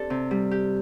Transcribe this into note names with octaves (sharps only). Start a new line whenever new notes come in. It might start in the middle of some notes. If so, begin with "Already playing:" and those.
Already playing: C4 D4 G4 A4
C3
G3
G4